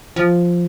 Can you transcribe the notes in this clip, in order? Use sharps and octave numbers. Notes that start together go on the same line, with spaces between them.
F3